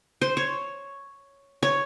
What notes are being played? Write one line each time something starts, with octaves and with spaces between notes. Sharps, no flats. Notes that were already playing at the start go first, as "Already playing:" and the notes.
C5
C#5
C#5